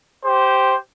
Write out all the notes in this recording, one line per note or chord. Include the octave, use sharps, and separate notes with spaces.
G4 C5